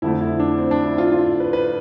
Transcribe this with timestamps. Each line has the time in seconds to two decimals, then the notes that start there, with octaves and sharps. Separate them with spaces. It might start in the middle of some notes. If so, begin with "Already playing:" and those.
0.02 F2 D3 A3 E4
0.21 E4
0.39 D4
0.58 C4
0.71 D4
0.85 E4
0.98 F4
1.12 F4
1.40 B4
1.53 B4